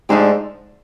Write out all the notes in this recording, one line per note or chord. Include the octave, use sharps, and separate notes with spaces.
G#2 F3 A3 D4 G4